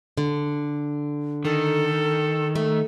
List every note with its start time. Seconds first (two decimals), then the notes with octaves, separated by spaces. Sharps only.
0.17 D3
1.45 D#3 A4
2.55 A3